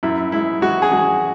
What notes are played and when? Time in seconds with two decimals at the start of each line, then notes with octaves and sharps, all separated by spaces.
0.03 F#2 E4
0.32 G#3 E4
0.62 G#3 F#4
0.82 G#4
0.91 G#3 F#4